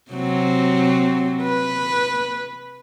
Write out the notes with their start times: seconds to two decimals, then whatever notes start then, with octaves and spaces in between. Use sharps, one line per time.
0.12 C3 F#3 C4
1.43 B4